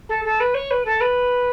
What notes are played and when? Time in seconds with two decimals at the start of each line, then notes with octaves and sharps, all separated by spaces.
0.09 A4
0.24 A4
0.40 B4
0.54 C#5
0.70 B4
0.85 A4
1.00 B4